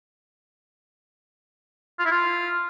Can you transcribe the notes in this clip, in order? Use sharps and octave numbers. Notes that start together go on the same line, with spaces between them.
F4
E4
F4